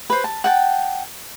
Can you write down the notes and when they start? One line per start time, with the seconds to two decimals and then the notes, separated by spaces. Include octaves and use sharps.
0.10 B4 C5
0.24 A5
0.44 F#5 G5 A5